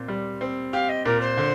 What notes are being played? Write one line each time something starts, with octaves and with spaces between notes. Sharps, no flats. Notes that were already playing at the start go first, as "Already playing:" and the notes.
Already playing: A#2 C4
G3
C4
G4 F5
D#5
A#2 A#4
C5
D3